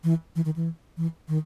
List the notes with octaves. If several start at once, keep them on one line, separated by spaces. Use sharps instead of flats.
E3
E3
D#3
E3
E3
D#3